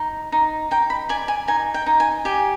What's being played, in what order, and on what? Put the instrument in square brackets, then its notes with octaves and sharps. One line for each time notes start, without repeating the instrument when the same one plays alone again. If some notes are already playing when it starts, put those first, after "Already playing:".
Already playing: [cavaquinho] D#4
D#4
D#4 G5
B5
D5 G#5
G#5
D#4 G#5
G5
D#4
G#5
G4 G#5